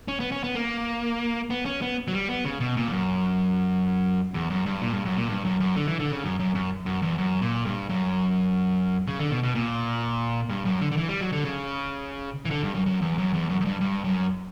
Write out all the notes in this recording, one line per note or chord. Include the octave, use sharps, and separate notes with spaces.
C#4
B3
C#4
B3
A#3
B3
C#4
B3
F#3
G3
B3
C#3
B2
A#2
E2
F#2
E2
F#2
G2
A#2
G2
F#2
A#2
G2
F#2
F#2
D3
E3
D3
C#3
F#2
F#2
F#2
F#2
E2
F#2
A#2
G2
F#2
C#3
D3
B2
B2
A#2
G2
F#2
D3
D3
E3
G3
F#3
D3
C#3
E3
D3
G2
F#2
F#2
E2
F#2
E2
F#2
F#2
G2
G2
F#2